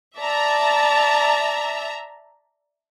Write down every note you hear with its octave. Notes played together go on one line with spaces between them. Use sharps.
D5 E5 A5 A#5